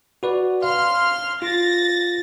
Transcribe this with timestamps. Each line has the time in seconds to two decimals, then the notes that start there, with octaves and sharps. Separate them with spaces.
0.23 F#4 B4 D5
0.63 F5 C6 F6
1.42 F4 A6 A#6